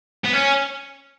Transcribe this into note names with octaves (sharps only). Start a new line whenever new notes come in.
B3
C#4